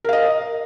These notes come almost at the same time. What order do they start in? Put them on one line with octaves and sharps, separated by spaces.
A#4 F5 D#5